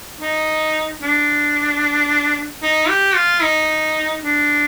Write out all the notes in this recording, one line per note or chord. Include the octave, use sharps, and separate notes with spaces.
D#4
D4
D#4
G4
F4
D#4
D4